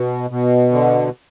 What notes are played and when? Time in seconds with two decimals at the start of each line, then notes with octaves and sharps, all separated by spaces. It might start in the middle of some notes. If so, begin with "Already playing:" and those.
Already playing: B2
0.30 B2
0.72 D3